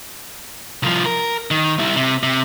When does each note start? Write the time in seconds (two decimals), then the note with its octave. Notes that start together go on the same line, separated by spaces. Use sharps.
0.83 C2 F3
1.06 A#4
1.51 D#3
1.79 G3 E4
1.96 C3
2.23 C3